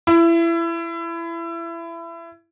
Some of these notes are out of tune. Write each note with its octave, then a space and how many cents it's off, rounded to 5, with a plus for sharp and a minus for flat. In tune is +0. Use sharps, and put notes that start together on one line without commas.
E4 +25